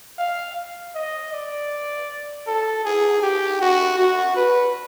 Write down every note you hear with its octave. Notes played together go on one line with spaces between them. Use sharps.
F5
D#5
D5
A4
G#4
G4
F#4
F#4
B4